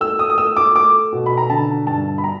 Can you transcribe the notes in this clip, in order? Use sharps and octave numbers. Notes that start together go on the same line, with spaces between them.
A3 E6
D#6
D#6
A3 E6
D6
A3 D6
B2
B5
A#5
D3 A5
G2 A5
B5
A#5